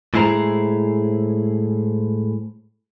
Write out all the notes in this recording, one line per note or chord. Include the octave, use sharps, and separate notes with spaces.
A2 G#3 E4 G#4 C5 A#5